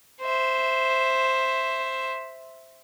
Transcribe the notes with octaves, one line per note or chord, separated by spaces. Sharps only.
C5 E5